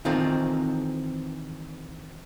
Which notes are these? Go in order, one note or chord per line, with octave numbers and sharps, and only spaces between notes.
D#3 E3 C4 D#4 F4 A4